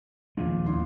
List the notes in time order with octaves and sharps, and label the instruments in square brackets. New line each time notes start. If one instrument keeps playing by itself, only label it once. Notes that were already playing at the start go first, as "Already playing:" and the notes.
[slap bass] D#2 F3 G#3 [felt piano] A#2
[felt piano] A1 A#2 C6